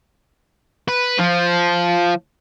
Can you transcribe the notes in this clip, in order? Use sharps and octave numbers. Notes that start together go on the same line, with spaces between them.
B4
F3